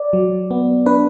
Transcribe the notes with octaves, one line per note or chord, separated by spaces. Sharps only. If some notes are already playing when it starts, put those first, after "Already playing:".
Already playing: D5
F#3
B3
D4 B4